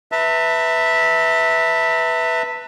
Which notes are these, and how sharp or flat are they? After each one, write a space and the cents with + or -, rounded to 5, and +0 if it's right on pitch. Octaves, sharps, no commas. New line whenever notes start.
B4 +0 E5 -10 A5 +40